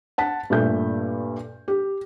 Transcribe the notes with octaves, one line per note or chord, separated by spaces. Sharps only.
F#5 A5 B6
G2 A#2 A3 G6
G4